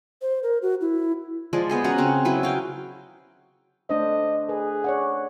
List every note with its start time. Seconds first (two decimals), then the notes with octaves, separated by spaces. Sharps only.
0.22 C5
0.43 A#4
0.62 F#4
0.81 E4
1.53 F3 G#3 D5
1.69 B3 G#4 C5
1.84 C#4 F#4 F#5 A#5
1.98 C#3 C4
2.25 F#3 E4 B4
2.43 F#4 F5 G5
3.90 A3 D4 C5 D#5
4.49 G#4 B4
4.84 C#5 D5 F#5